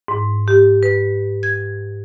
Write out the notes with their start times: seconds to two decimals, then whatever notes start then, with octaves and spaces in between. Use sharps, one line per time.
0.08 G#2
0.48 G4
0.83 B4
1.43 G#6